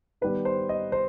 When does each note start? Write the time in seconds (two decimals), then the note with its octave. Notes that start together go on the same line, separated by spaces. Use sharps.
0.21 D#3 G3 B3 B4
0.45 C5
0.69 D#5
0.92 C5